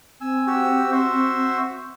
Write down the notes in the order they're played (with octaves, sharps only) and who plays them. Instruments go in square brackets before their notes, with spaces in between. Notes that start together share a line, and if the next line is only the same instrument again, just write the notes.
[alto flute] C4 [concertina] G#5 E6
[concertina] F#4 G4 E6
F#4 C5 E5